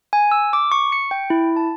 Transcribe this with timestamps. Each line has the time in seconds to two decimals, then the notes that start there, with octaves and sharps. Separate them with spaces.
0.13 G#5
0.32 E6
0.53 D6
0.72 C#6
0.92 C#7
1.11 G5
1.30 E4
1.56 A5